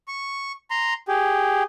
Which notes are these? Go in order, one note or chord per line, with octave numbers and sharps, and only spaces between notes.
C#6
A#5 C6
G4 G#4